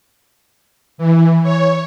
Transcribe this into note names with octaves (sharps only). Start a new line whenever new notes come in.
E3
C#5